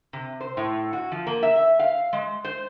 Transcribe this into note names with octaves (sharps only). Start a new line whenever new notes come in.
C3
C5
A2
F#4
F3
A#3
E5
E5
F5
G#3
C5